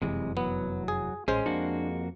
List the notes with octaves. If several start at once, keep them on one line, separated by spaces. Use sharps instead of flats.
F1 F#2 C3 E3 G#3
F#3 B3
G#4
A1 G#3 C#4 C5
F2 A#3 D4 F#4